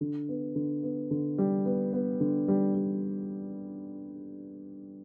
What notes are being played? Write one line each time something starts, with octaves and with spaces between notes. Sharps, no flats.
D3
B3
D3
B3
D3
G3
B3
B3
D3
G3
G3